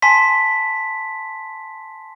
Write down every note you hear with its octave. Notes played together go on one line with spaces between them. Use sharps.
G#5 A5 C6 B6